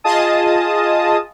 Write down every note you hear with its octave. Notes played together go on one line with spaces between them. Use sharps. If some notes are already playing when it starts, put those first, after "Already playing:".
F4 G#4 D#5 A5 D#6